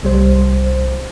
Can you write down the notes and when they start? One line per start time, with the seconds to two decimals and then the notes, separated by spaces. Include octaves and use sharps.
0.03 C2 G3 C5